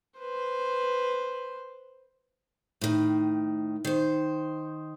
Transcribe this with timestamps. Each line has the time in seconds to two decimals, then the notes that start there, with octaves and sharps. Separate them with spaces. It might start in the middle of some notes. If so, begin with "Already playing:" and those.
0.19 B4 C5
2.81 A2 D#3
3.85 D#3 C5